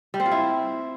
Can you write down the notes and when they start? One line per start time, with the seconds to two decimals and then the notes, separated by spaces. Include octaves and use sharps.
0.14 G3
0.20 C4
0.26 F4
0.31 E4